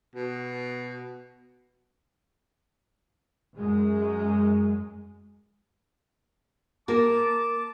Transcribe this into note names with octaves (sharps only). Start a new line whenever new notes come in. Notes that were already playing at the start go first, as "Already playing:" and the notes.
B2
F#2 G#3
A#3 A#4 A5 D6